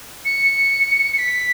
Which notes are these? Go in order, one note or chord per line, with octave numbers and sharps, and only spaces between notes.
C#7
C#7
B6